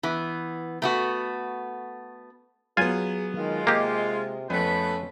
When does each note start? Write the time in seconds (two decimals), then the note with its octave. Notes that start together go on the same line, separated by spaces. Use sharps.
0.03 E3 B3
0.82 A3 B3 F#4
2.77 F#3 B3 F4 G#4 G#5
3.36 D#3 G#3 F4
3.67 C3 A#3 G4 D#5
4.50 F2 A3 B3 C#4 B4